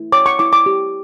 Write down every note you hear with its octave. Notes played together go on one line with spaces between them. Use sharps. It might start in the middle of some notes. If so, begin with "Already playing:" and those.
Already playing: E4
C#5 D6
C#6
E4 D6
D6
G4